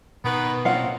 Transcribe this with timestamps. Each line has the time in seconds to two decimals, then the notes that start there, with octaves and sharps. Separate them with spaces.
0.25 B2 D#3 B3 B4
0.65 A#2 C4 C#4 F5 F#5